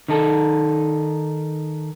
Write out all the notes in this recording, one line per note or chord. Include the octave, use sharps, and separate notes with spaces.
D#3 D#4 A4